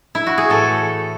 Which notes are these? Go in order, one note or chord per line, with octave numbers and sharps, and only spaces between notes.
E4
F#4
G#4
A2 E3 A3 A4